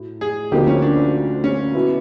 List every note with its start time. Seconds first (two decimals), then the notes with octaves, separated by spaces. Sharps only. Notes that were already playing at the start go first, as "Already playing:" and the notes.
Already playing: A2 F#3
0.21 G#4
0.52 D2 D3 F3 A#3 D#4 G4
0.68 C#4
0.82 D4
1.44 C#4
1.74 B2 F#3 B3 E4